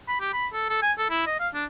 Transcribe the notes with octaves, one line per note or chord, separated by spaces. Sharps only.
B5
G4
B5
A4
A4
G#5
A4
E4
D#5
F5
D4